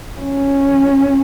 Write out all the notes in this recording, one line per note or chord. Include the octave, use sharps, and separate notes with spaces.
C#4